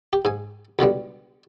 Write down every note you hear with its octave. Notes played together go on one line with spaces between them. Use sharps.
G4
G#2 G#5
C#2 B2 D3 G3